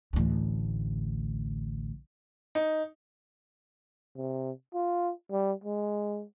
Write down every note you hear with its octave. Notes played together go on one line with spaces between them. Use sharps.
A1 D2
D#4
C3
F4
G3
G#3